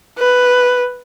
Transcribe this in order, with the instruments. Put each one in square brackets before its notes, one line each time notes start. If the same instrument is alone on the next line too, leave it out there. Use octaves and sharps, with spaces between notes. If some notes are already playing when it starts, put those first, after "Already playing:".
[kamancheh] B4